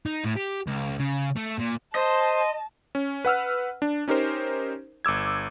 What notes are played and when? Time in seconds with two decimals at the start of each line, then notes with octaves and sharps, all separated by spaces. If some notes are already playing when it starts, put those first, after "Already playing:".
0.06 D#4
0.25 A2
0.36 G4
0.67 C#2
0.99 C#3
1.36 A3
1.58 A#2
1.95 C5 D#5 A5 C6
2.95 C#4
3.25 B4 F#5 E6 F6
3.82 D4
4.08 C#4 D#4 G4 A#4 C5
5.05 G1 D6 E6 G#6